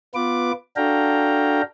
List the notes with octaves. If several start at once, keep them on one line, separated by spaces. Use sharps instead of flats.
B3 F4 B4 D6
D4 F#4 A4 F5 G5 A#5